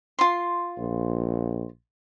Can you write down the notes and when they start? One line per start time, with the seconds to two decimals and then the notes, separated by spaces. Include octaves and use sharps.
0.19 F4 C6
0.77 A#1